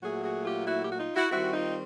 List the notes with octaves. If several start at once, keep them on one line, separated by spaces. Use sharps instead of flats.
A#2 F#3 A3 F#4 G#4
F#4 G#4
F4 G4
E4 F#4
G4
F#4
D#4 F4
E4 F#4
D#3 G3 C4 E4 F#4
D#4 F4